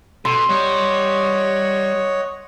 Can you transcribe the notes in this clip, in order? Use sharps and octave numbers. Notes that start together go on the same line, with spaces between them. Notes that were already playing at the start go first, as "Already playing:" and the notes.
B2 A4 C6
G3 C#5 D#5 F#5